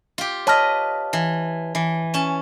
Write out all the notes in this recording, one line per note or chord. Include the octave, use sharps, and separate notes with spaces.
F4 G4
B4 C#5 D#5 A5 F6
E3
E3
C#4 A5